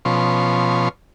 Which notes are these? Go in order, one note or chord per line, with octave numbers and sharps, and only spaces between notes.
B2 F3 C#4 C6